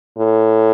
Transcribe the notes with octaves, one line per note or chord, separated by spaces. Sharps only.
A2